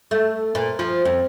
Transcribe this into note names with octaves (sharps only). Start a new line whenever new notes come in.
A3
A#2
F3
F2